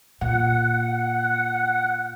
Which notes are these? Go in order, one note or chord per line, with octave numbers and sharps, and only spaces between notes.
A#2 F#5